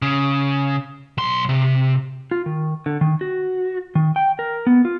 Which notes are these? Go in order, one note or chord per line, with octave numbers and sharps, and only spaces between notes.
C#3
B1 C6
C3
F4
D#3
D3
D#3
F#4
D#3
G5
A#4
B3
F4